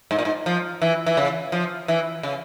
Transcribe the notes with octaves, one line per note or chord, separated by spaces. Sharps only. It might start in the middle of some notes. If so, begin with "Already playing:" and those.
G#2
A#2
G#2
F3
E3
E3
C#3
F3
E3
C#3